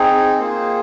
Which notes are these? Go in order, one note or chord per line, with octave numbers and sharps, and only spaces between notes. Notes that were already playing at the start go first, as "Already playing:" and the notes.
Already playing: C4 D#4 G#4
A#3 F4 G#4 C5